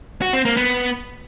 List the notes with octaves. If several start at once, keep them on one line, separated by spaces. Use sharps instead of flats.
F#4
C4
A#3
B3